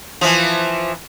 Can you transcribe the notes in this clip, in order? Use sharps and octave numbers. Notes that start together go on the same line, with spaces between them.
E3 F3